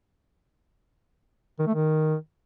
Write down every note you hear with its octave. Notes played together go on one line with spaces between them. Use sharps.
D#3
A3
D#3